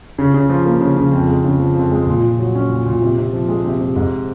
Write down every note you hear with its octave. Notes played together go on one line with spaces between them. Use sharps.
C#3
C#3
F3
A#3
C#3
C#3
F2
G#3
C#3
F3
F2
G#3
A#2
A#2
F#3
C#4
A#2
A#2
C3
C3
F3
G#3
C3
C3
G#2